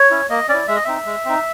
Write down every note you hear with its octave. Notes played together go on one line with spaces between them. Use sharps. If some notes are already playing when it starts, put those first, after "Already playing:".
Already playing: C#5
C#4 E4
A#3 D#5
C#4 E4 D5
G#3 E5
D#5
C4 D#4 E5
G#3
C4 D#4